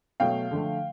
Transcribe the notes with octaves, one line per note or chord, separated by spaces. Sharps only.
B2 F#3 A3 F5 G5
D3 F3 A3